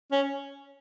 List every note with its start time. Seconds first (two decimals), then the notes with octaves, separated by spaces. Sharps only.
0.11 C#4